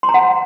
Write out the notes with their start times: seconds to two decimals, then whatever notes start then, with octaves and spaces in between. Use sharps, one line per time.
0.03 C6
0.09 A#5
0.14 F#5